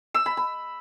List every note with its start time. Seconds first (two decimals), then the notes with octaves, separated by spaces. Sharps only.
0.14 E6
0.26 B5
0.37 B5